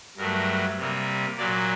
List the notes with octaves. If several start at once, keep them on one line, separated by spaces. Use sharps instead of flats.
G2 F#3 A3 A#4
C3 G3 A#3
A#2 F#3 A#3 D5